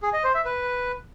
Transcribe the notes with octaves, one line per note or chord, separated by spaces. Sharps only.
G#4
D#5
C5
E5
B4